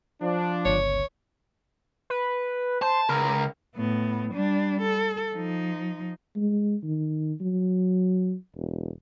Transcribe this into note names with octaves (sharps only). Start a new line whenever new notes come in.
F3 D4
G1 C#2 C#5
B4
C5 A5
C#2 A#4
A2 B3
G3 D4
A4
F3 D#4
G#3
D#3
F#3
E1